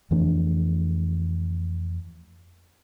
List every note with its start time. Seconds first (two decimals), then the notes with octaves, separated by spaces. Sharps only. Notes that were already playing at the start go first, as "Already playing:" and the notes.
0.11 F2 E3 A3 D4